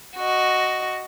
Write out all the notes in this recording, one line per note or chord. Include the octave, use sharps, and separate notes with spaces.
F#4 D#5